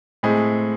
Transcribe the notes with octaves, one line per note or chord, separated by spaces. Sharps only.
A2 G#3 C4 G#4